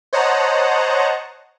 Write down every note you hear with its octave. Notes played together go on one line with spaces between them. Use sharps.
C5 C#5 D#5 F#5 A5 A#5